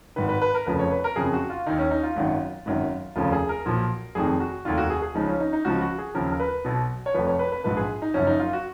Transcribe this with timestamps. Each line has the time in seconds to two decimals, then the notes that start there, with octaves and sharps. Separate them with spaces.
0.16 G#1 G#2 D#3 B4
0.29 B4
0.42 B4
0.54 A#4
0.66 F1 F2 C#3 F3 B4
0.79 C#5
0.91 B4
1.04 A#4
1.16 F#1 F2 C#3 G#4
1.33 F#4
1.50 F4
1.66 D#2 D#3 D#4
1.79 C#4
1.91 D#4
2.03 F4
2.16 G#1 F#2 D#3
2.66 G#1 F#2 D#3
3.16 F1 D#2 C#3 F3 F4
3.32 G#4
3.49 A#4
3.65 B1 A#2 F3
4.15 F1 F2 D#3 G#4
4.40 F#4
4.65 F1 D#2 D#3 F4
4.78 F#4
4.90 G#4
5.02 G#4
5.15 C#2 C#3 F3 D#4
5.27 C#4
5.40 D#4
5.53 D#4
5.65 C#2 C#3 F3 F#4
5.82 F#4
5.99 G#4
6.15 D#2 C#3 F3 A#4
6.32 A#4
6.40 B4
6.65 B1 B2
7.06 C#5
7.14 F1 F2 F3 B4
7.27 C#5
7.39 B4
7.52 B4
7.64 A#1 G#2 F3 B4
7.77 G#4
8.02 D#4
8.14 F#1 F#2 F3 C#4
8.27 D#4
8.39 F4
8.53 F#4